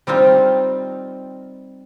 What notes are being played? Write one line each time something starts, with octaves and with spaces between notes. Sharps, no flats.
G3 C4 D#4 F4